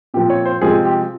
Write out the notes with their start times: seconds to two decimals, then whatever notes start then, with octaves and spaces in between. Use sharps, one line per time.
0.14 A#2 F3 C4 G4
0.30 C#5
0.45 C5
0.62 C3 F3 G#3 C4 G#4
0.85 G4